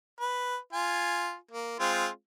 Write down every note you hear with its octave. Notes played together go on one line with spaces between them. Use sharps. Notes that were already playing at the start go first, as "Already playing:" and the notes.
B4
F4 G#5
A#3
G#3 C4 F4